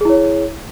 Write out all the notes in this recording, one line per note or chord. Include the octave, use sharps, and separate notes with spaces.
E4 G#4 C#5